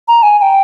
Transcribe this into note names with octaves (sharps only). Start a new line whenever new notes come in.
A#5
G#5
G#5
G5